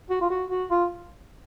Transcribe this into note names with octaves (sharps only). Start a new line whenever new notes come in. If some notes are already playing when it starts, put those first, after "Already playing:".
F#4
F4
F#4
F#4
F4